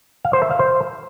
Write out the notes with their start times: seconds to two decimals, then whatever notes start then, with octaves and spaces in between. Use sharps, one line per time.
0.25 F5
0.33 C5
0.42 E5
0.51 F5
0.59 C5